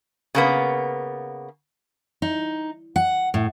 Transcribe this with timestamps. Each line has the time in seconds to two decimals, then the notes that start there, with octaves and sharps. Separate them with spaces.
0.35 C#3 A#3 B3
2.22 D#4
2.96 F#5
3.34 A2